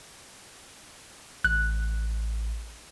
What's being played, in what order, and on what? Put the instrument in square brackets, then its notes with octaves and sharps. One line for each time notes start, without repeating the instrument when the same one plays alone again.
[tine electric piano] A1 [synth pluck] F#6